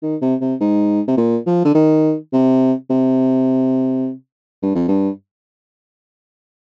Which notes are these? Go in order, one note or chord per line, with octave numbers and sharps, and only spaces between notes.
D#3
C3
C3
G#2
C3
A#2
F3
D3
D#3
C3
C3
G2
F2
G2